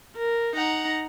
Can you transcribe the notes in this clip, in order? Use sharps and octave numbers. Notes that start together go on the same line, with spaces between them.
A#4
D#4 F#5 A#5